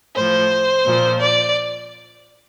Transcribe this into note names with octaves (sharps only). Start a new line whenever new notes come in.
A2 F3 C5
A#2 F3
D5